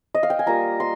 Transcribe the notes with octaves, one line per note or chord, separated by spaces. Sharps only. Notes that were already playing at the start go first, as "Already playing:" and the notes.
D#5
F5
G5
G#5
G3 A#3 F4 A#5
C6